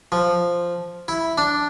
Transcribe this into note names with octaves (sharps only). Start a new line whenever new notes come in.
F3
E4
D4